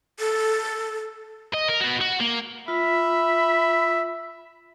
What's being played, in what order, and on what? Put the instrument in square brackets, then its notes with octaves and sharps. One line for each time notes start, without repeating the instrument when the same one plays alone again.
[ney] A4
[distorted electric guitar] D#5
A#4
B3 F#4
F#4
A#3
[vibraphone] F4 [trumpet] E5 [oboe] B5